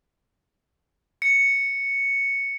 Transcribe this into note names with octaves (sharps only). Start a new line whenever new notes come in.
C#7